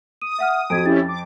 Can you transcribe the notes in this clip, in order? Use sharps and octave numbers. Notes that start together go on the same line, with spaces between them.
D#6 D#7
E5 F#5 F6
F2 F#4 G#6 D7
C#4 E4 G4 A6
D6